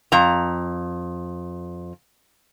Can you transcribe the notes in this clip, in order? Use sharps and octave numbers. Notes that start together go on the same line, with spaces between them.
F2 A#5